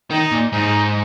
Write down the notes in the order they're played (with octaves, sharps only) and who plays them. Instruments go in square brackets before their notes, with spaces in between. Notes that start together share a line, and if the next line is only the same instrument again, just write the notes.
[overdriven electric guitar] D#3 [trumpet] D#4
[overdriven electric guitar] A#2
[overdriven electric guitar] G#2 [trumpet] D#4